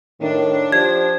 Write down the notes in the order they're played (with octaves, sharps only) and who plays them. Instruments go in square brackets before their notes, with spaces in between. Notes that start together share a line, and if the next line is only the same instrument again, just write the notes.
[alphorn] A2 [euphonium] D#3 [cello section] D4
[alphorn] F3 [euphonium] G4 [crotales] G#6